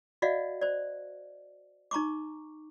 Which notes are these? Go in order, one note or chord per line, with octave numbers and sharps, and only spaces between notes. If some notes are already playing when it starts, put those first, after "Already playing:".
F#4 D5 D#5 F5 F#5
C5 D5
D#4 A#5 C#6 D6